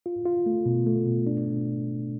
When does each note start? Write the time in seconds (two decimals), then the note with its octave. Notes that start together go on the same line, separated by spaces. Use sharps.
0.06 F4
0.26 F4
0.46 A3
0.66 B2
0.86 A3
1.06 B2
1.27 D4